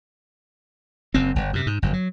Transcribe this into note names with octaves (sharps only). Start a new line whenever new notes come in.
F#1 F#2 C4
G1
F#2 C3
G#2
G1 F#2
F#3